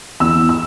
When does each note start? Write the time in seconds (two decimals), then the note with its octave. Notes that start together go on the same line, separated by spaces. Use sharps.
0.20 E2 E6
0.49 E6